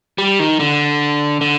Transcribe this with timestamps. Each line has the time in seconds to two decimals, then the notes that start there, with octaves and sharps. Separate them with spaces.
0.18 G3
0.40 D#3
0.60 D3
1.41 D3